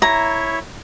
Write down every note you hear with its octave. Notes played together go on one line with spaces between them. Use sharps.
E4 C#5 E5 A#5